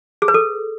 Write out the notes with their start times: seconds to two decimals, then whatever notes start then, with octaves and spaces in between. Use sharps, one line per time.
0.22 G#4
0.28 B4
0.34 A4